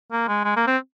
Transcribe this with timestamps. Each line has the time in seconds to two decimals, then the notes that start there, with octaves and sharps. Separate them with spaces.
0.12 A#3
0.28 G#3
0.45 G#3
0.57 A#3
0.67 C4